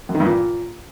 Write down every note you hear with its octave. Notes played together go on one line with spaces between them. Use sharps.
F#2
D#3
G2
A#2